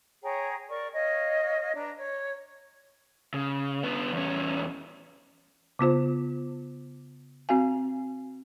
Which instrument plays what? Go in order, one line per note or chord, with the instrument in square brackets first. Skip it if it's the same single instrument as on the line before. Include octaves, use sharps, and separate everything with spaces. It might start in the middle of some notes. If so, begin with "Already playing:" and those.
[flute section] G#4 C#5 G5 A#5
A#4 D5 C#6
C#5 D#5 F5
D4 B4 A#5
C#5
[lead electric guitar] C#3
B3 D4
E2 C#4
[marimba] C#3 B3 F4 C5
C4 F#4 F5 G#5